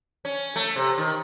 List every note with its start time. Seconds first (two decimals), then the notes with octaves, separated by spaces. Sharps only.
0.25 C#4
0.56 A3
0.76 C3
0.98 D#3